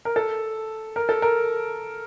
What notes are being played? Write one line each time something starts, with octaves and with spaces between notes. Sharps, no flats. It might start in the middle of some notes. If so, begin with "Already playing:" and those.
A#4
A4
A#4
A4
A#4